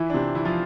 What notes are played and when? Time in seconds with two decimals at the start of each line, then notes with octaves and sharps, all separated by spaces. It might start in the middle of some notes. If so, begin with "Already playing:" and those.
Already playing: E3 E4
0.10 D4
0.14 C3 C4
0.35 E3 E4
0.45 F3 F4